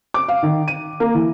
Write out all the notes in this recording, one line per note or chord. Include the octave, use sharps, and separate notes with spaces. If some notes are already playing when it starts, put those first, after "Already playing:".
D6
F5
D#3
D#7
A#3
E3